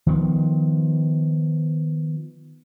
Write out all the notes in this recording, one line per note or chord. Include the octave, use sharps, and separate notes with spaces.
D#3 F3 B3